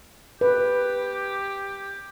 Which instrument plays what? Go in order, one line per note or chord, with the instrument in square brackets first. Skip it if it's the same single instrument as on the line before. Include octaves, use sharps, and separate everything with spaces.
[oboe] G4 [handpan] B4